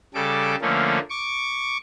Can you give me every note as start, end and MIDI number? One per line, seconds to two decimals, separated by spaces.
0.14 0.55 49
0.14 0.55 55
0.14 0.55 69
0.14 0.55 86
0.61 0.99 50
0.61 0.99 53
0.61 0.99 57
0.61 0.99 58
0.61 0.99 61
1.10 1.77 85
1.10 1.77 86